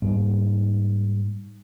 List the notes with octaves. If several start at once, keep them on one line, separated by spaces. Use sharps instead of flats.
G#2 G3 A#3